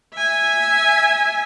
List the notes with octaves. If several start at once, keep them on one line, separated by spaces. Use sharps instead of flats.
E5 G#5